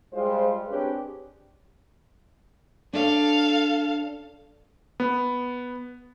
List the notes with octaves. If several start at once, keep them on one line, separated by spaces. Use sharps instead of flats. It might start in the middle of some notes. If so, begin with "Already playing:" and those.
G3 G#3 F4 C5
C4 D4 G4 G#4 B4 C#5
D4 A4 C#5 F5
B3